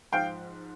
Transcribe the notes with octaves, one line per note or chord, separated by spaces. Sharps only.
G#2 F3 F5 G5